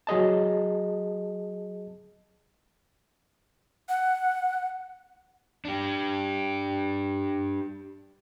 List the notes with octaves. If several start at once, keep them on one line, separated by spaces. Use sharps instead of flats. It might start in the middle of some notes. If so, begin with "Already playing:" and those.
F#3 G#4 D#5 A5
F#5
D4 G4